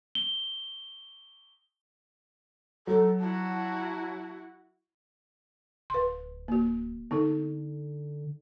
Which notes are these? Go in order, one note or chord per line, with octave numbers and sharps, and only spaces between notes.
G7
F#3 A4
E4 F#4 A5
D1 B4 C6
A#3 F#4
D3 B3 D#4 A4